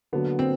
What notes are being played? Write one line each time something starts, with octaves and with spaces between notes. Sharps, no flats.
D3 F#3 A#3 B3 D4 F#4
C4